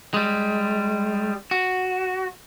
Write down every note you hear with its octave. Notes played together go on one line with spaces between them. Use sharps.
G3 G#3
F#4